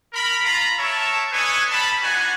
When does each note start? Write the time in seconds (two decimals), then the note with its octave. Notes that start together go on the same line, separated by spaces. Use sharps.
0.13 A#4 B5
0.43 F4 A#5 B5
0.79 A#4 C#5 E5 A5
1.32 D4 A4 B4 C#5 D#5 G#5
1.69 G3 A5 B5
2.02 D4 D#4 F#4 B4 F#5 G#5